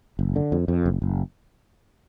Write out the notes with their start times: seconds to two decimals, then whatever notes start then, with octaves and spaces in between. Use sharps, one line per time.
0.19 F#1
0.36 D3
0.52 F2
0.68 F2
0.86 F#1
1.02 F#1